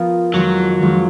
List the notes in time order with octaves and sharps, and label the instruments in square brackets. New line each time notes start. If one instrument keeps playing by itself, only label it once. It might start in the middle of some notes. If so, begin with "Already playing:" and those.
Already playing: [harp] F3 B3 F4 A#4
[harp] F2 D#3 G#3 [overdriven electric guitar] F#3
[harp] F2 D#3 G#3